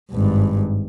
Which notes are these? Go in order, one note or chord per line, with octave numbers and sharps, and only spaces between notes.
G#1 G2